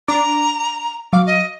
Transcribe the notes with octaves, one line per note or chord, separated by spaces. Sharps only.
D4 A#5 D6
F#3 F5 D6
D#5